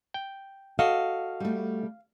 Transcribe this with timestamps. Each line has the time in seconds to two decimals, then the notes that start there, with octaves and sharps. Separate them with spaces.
0.14 G5
0.79 F#4 A4 D#5 F5
1.40 G3 A3